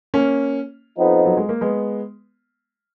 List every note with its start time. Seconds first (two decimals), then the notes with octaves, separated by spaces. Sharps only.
0.14 A#3 C#4
0.98 F2 F3 B3 D#4
1.25 F#3
1.37 G#3
1.49 A#3
1.61 G#3 B3